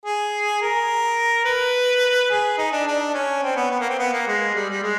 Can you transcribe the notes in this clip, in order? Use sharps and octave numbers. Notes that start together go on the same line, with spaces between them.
G#4
A#4
B4
G#4
D#4
D4
D4
C#4
C4
B3
B3
A#3
C4
B3
A#3
G#3
G3
G3
G#3